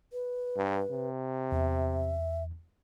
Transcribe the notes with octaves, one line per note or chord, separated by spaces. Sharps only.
B4
G2
C3
E2 E5